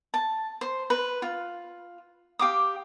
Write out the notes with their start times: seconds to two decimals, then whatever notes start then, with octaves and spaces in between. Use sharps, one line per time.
0.14 A5
0.61 C5
0.90 B4
1.22 F4
2.39 G4 F5 D6 D#6